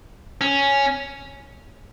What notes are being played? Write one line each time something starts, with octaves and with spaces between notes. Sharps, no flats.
C#4